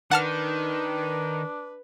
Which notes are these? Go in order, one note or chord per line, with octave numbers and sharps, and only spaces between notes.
D#3 D4 B4 F#5 A5 F6